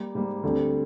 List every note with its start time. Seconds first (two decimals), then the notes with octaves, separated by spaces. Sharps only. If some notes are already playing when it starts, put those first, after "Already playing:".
Already playing: G3 A#3
0.15 G#2 G3 A#3
0.43 D2 D3 G3 C4 G4